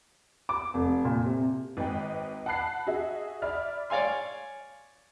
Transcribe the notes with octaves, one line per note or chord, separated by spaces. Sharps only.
D6
F1
A#2
C3
G#1 B4 D#5 G5
F#5 A5 B5 F#6 C7
F#4 G#4 D#5 E5
D5 E5 B5 F6
C#5 D5 F5 G#5 C6